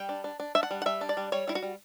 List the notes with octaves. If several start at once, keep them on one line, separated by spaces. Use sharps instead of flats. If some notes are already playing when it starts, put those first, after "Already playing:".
Already playing: G3 G5
D4
D4
D4
D4 E5
F#5
G3
F#5
G3 E5
D4
D5
G3
G3 C#5
G3 E4
F#4
G3